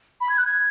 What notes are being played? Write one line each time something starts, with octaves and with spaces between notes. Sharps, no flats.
B5
G#6
F#6
G#6